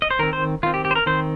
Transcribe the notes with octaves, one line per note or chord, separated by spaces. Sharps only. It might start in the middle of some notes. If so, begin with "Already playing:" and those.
D#5
C5
D#3 C4 A#4
C5
D#3 C4 F4
G4
G4
C5
A#4
D#3 C4 C5